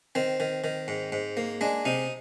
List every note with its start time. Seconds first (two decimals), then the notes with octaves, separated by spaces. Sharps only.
0.15 D#3 C4
0.40 D#3
0.64 D#3
0.88 G#2
1.12 G#2
1.37 A#3
1.61 G#3 D4
1.85 C3 D#4